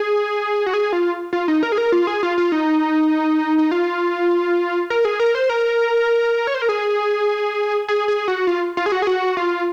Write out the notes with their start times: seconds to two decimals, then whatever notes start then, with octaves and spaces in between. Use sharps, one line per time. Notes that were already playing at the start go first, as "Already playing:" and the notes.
Already playing: G#4
0.66 F#4
0.74 G#4
0.93 F4
1.33 F4
1.48 D#4
1.63 A#4
1.72 G#4
1.78 A#4
1.92 F4
2.07 G#4
2.23 F4
2.38 F4
2.52 D#4
3.58 D#4
3.71 F4
4.90 A#4
5.05 G#4
5.20 A#4
5.35 C5
5.49 A#4
6.47 C#5
6.54 C5
6.62 A#4
6.69 G#4
7.88 G#4
8.08 G#4
8.28 F#4
8.47 F4
8.77 F4
8.86 G#4
8.92 F#4
9.02 G#4
9.07 F#4
9.37 F4